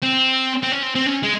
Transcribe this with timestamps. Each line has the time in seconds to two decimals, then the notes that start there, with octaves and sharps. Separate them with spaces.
0.03 C4
0.63 C4
0.72 C#4
0.83 C4
0.95 C4
1.06 C#4
1.23 G#3